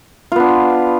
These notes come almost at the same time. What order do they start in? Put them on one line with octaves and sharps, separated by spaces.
F4 B3 D4